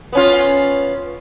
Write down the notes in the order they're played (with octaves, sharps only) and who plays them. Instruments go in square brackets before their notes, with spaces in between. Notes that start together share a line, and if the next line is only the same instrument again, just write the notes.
[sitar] B3 C#4 F4